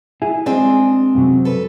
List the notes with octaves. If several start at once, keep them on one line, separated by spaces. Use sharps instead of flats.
E4 G#4
G#3 C4 D4 G#4 D#5
F#2 C3 F#3
A4 B4